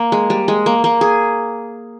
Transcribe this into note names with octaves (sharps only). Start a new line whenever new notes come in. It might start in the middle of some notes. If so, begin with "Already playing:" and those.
Already playing: A#3
G#3
G3
G#3
A#3
A#3
G#4